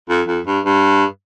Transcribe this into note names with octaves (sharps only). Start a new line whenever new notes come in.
F2
F2
G2
G2